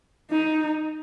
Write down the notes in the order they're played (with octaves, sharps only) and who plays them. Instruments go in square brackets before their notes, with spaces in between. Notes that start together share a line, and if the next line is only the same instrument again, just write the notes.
[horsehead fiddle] D#4